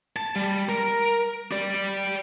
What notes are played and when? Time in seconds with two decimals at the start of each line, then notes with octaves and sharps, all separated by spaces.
0.16 A5
0.36 G3
0.69 A#4
1.52 G4 D5